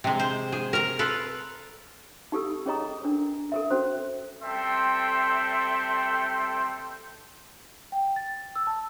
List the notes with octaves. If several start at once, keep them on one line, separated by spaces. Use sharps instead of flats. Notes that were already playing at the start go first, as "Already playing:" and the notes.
C3 G#3
C5
G#4
A#4 A#5
F4 A4 B4
D#4 G4 A4 E6
C#4 G#4 C#5 D#5 A#5 D#6
C#4 D4 A#4
A4 A#4 E5
C#4 F#4 C5
G3 C4 A4 E5 G5 C6
G5
A6
E6
A5